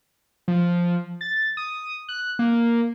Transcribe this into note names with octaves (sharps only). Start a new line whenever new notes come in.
F3
A6
D#6
F#6
A#3